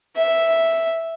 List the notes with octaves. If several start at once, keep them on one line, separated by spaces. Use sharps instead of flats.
E5